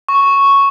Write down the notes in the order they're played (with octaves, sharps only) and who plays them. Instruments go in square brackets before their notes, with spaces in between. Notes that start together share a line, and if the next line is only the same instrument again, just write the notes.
[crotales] C#6